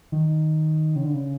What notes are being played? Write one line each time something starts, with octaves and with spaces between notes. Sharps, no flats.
D#3
C#3
D3
C#3